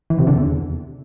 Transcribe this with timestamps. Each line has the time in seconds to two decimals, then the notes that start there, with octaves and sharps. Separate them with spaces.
0.10 E3
0.19 C3
0.27 D3
0.35 E2